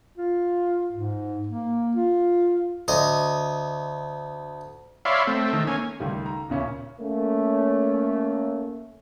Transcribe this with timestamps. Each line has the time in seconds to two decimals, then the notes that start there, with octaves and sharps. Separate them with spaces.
0.18 F4
0.92 G#2
1.47 A#3
1.95 F4
2.88 D2 D#5
5.05 C#5 D5 E5 F5 B5 C6
5.27 A3 C4
5.53 D#3 A3
5.67 A#3 C#4 G#5
6.00 C#2 D#3 G3 A3
6.26 A#5
6.49 D#1 A#2 C#3 C#4 E5
7.00 A3 A#3 C#4